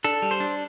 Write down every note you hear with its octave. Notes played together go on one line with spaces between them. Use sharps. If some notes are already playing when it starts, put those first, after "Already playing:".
D4 A4
G3
C5
D4